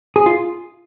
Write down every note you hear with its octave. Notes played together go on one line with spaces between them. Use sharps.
G#4
F4